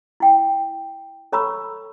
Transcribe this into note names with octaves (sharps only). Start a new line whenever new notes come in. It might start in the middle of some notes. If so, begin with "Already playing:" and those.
E4 G5
A4 C#5 A#5 B5 C#6 E6